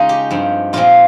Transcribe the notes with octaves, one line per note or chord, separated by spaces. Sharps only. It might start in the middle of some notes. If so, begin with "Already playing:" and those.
Already playing: C#3 G#3 C#4 D#4 F4
G4
G2 F3 C4
A#2 F3 G#3 C4 F4